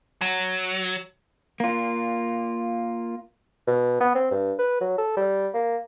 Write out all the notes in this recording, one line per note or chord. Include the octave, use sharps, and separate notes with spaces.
F#3
A#3 F4
B2
B3
C4
G2
B4
F#3
A4
G3
A#3